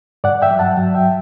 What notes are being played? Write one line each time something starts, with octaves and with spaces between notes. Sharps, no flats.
G2 D5 F#5
E5 G5
F#3
F#5 A5
F#3
E5 G5